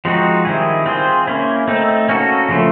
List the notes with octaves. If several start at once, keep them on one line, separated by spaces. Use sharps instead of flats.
F3 G#3 C4 D#4 F#4
D#3 G3 C4 E4 G#4
C4 F4 G#4 C5
A#3 C#4 E4
A3 C4 D#4
A#3 C#4 F#4 A4
C#3 F3 A3